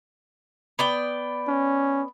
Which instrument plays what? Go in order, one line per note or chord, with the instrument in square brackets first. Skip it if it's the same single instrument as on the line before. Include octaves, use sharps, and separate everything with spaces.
[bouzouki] B3 D5 G5
[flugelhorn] C#4